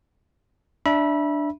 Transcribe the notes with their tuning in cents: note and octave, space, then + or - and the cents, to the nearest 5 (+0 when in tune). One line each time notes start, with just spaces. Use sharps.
D4 +0 E5 +0 B5 -30